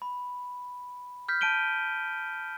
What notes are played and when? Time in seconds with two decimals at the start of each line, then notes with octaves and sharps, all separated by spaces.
0.02 B5
1.29 F6 G6 B6
1.41 A5 G6 D7 D#7 G7